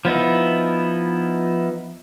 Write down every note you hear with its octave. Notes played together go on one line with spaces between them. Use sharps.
F3 B3 D#4 E4